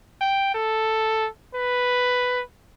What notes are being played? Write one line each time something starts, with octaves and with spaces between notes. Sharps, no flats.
G5
A4
B4